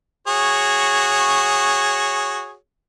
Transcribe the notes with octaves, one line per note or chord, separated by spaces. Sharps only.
F#4 G#4 C#5